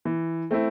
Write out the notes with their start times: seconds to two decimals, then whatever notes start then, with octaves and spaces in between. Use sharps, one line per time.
0.05 E3
0.51 A3 C4 E4